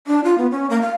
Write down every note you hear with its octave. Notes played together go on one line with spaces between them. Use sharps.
D4
F4
B3
C#4
A#3
F5